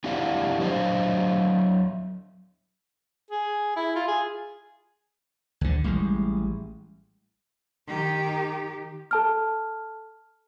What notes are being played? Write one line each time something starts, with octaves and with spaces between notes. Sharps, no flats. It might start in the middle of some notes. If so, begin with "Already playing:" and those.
C4 D4 E4 G4 F5 F#5
F#3 D4 C5 D#5 F5
G#4
E4
F4
G#4
D2 D3
A1 G3 G#3
D#3 G4
A4 A5 F6